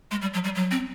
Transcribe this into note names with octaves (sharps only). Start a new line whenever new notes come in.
G#3
G3
F#3
G3
F#3
C4